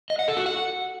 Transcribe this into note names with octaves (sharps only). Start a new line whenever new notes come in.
D#5
F#5
A4
F#4
F#5